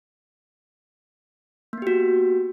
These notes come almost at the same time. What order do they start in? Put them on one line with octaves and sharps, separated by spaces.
A#3 B3 G4 F#4